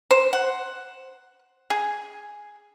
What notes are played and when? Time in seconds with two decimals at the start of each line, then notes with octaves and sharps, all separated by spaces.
0.11 C5
0.33 F#5
1.70 G#4